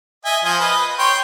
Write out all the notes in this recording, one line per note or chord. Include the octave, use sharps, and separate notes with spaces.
D#5 E5 G#5
F3 D#5 G#5
B4 D#5
C#5 G5 C6